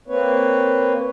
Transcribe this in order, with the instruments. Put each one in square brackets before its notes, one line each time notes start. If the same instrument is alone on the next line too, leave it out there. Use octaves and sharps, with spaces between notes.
[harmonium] A#3 C4 B4 C#5